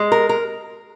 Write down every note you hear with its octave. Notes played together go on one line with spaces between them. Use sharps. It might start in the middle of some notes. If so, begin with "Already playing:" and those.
Already playing: G#3
A#4
A#4